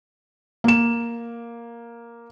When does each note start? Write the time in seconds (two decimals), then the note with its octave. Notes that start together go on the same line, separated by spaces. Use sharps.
0.64 A#3 E7